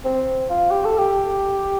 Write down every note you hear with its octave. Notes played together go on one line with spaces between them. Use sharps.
C4
F4
G4
A4
G4